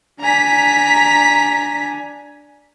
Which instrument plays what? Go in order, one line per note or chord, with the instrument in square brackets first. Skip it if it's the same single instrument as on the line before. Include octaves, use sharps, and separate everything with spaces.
[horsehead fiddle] D4 G#5 [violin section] A#5 B6